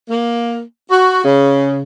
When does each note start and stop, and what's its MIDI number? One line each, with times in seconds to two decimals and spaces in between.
0.10 0.61 58
0.91 1.22 66
1.23 1.82 49